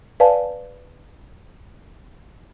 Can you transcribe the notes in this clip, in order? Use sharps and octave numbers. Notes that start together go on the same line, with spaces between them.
B4 D5 F5 G#5 A5